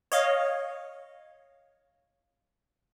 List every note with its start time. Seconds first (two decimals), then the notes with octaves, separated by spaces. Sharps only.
0.12 C#5 D#5 F5